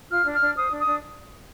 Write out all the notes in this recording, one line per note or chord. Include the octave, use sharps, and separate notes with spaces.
F4 F6
D4
F6
D4
C5 D#6
D4
D#6
D4